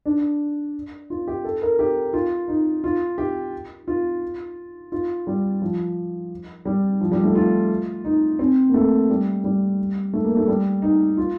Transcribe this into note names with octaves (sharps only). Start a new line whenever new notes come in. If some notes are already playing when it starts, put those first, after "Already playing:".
D4
F4
G4
A4
A#4
G4
F4
D#4
F4
G4
F4
F4
G3
F3
G3
F3
G3
A3
F4
D#4
C4
A#3
A3
G3
G3
A3
A#3
A3
G3
D#4
F4